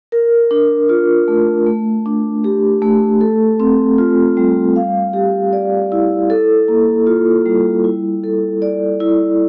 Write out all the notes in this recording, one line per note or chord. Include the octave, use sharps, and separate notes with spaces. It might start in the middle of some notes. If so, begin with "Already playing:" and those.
A#4
D4
F4
A3
A3
D4
G4
A3
A4
C4
F4
G3
F5
G4
D5
E4
A4
A#3
F4
G3
E4
A4
D5
E4